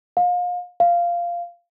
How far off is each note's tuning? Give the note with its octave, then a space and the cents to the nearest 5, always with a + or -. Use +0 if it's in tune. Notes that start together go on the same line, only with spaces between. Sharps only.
F5 +35
F5 -10